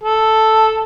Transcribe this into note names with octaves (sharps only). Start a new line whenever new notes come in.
A4